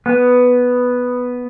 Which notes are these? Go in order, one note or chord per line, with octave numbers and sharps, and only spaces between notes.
B3